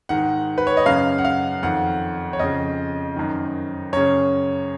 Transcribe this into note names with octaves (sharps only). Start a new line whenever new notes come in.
G#2 D#3 F#5
B4
C#5
D#5
F#2 C#3 F5
F#5
F5
F2 D#3 F#5
C#5
F2 C#3 D#5
F#2 D#3
F#2 C#3 C#5